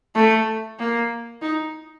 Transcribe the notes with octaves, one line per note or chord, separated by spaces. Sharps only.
A3
A#3
D#4